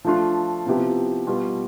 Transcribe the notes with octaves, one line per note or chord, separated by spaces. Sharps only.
F3 A3 D4 F4
C3 F3 B3 E4 G4
B2 G3 B3 F4